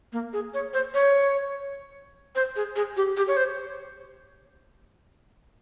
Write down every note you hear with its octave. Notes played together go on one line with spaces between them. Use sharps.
A#3
G#4
C#5
C5
C#5
C5
G#4
G#4
G4
G4
C#5
C5